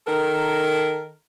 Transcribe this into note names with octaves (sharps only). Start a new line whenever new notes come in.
D#3 A4 A#4